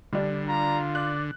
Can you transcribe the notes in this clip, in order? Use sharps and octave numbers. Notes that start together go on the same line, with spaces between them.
D3 G3 D4
F4 A#5
D5 F#6